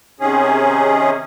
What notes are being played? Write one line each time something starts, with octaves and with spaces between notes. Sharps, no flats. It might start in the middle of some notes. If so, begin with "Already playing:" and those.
C3 D#3 C#4 G#4